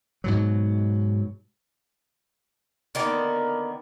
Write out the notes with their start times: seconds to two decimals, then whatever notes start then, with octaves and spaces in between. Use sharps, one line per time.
0.24 G#2 B2 F#3
2.95 D3 D#3 A#3 B3